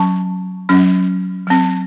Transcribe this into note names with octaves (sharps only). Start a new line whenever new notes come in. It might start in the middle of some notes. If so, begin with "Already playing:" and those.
Already playing: F#3 C#4 A5 C#6
F#3 C#4
F#3 C4